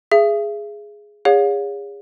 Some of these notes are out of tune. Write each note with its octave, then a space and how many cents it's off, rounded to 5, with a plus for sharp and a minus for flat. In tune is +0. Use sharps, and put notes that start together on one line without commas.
G#4 +0 E5 +40
G#4 -30 C#5 +30 F5 +40